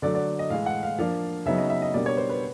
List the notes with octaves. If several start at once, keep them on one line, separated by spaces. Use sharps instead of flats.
D3 F#3 A3 D4 D5
D5
D#5
A2 E3 G#3 F5
F#5
F5
F3 A#3 D4 F5
C#3 F#3 B3 D#4 E5
D#5
E5
D#5
B2 G3 A#3 D4 D5
C#5
C5
B4